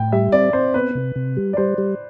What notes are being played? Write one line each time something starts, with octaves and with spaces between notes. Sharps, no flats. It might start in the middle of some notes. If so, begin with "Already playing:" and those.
Already playing: A2 G5
G3 E5
C4 D5
C4 C5
B3 B4
C3
C3
G3
D5
G3 C5
G3